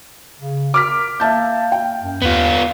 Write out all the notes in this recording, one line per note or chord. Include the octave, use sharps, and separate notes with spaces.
C#3
A#4 D6 F6 B6
A#3 E5 A5 G6
G5
F#2
D#2 B3 F4